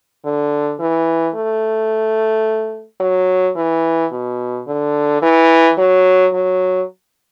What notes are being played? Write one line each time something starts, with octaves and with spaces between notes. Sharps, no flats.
D3
E3
A3
F#3
E3
B2
D3
E3
F#3
F#3